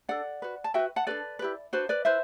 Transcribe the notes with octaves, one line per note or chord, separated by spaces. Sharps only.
D4 A4 D5 F#5
F#4 B4
A5
F#4 B4 E5 G5
F#5 A5
D4 F#4 A4 B4 D5
E4 G4 B4
D4 F#4 B4 C5
B4 D5
E4 B4 C5 E5